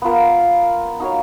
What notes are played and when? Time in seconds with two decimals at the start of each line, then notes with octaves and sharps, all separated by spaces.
0.02 B3 F4 A#4
1.00 D#4 F#4 C#5 F5